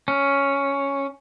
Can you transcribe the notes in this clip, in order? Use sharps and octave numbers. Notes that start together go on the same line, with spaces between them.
C#4